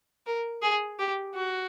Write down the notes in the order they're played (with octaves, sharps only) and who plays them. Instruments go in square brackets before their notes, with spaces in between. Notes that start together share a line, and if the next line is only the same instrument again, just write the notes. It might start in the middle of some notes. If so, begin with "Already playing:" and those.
[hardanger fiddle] A#4
G#4
G4
F#4